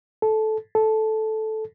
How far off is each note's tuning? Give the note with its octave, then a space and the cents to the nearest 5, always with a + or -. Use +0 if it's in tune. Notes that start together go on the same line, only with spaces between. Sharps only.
A4 -15
A4 -10